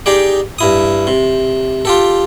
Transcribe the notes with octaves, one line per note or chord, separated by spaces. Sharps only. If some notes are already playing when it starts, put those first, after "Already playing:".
D#4 G4 G#4 D5
G2 E4 D#6
C3
F4 G4 A4